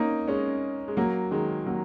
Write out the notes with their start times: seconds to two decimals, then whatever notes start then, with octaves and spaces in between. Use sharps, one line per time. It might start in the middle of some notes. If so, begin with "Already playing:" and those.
Already playing: A#3 C#4 D#4
0.28 G#3 C#4
0.88 G#3
0.97 F#3 A#3
1.31 D#3 G#3
1.66 F#3 A#3